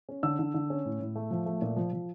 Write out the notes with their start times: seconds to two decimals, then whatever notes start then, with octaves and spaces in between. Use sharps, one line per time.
0.09 C#4
0.23 D3 E6
0.39 D3
0.54 D3
0.70 C#4
0.85 A2
1.00 A2
1.16 A3
1.31 F3
1.46 A3
1.62 A#2
1.76 F3
1.93 F3